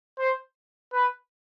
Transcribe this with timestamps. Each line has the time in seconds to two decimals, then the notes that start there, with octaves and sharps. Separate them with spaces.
0.19 C5
0.93 B4